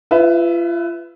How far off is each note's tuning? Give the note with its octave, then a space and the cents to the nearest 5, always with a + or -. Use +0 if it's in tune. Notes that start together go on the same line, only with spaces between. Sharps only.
F4 -35 B4 +20 E5 -5